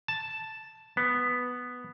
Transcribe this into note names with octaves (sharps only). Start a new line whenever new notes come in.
A5
B3